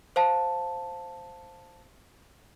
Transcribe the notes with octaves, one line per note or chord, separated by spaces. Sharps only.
C5 F5 A5